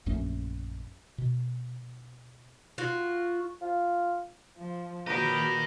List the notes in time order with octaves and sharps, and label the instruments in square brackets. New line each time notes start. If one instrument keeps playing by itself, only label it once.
[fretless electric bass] A#1 F#2 A3 C#4
B2
[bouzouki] F4 F#4
[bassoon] F4
[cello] F3
[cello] A#2 F#4 [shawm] G4 [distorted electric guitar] A#4 D#5 [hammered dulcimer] B4 B5